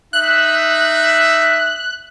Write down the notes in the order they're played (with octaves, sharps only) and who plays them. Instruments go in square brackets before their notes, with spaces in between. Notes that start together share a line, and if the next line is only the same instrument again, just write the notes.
[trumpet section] D#4 E5 [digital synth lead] F#6